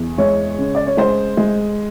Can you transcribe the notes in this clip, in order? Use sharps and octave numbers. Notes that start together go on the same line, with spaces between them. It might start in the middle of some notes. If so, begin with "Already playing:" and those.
Already playing: E2
G#3 C#5
C#3
D5
C#5
G#3 C5
G#3